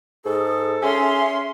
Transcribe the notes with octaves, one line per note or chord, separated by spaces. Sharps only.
G#2 G#4 A4
C#4 G#4 E5 C6